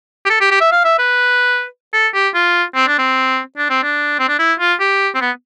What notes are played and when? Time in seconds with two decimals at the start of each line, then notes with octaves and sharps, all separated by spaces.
0.26 G4
0.30 A4
0.41 G4
0.51 G4
0.61 E5
0.72 F5
0.85 E5
0.99 B4
1.93 A4
2.14 G4
2.34 F4
2.76 C4
2.88 D4
2.98 C4
3.57 D4
3.70 C4
3.83 D4
4.19 C4
4.29 D4
4.39 E4
4.60 F4
4.80 G4
5.15 C4
5.21 B3